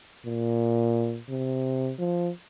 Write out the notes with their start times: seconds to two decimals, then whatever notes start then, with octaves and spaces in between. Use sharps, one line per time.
0.26 A#2
1.30 C3
1.99 F3